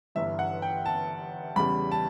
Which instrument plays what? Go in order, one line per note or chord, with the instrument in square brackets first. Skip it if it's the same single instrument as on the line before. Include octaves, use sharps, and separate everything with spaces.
[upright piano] G1 G2 E3 G3 E5
F#5
G5
A5
E2 C#3 G3 B5
A5